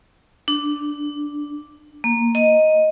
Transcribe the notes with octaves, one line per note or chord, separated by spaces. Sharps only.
D4
A#3
D#5